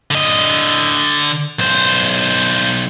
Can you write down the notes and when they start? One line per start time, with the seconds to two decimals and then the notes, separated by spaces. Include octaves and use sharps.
0.11 D3 D#5
1.59 B1 C5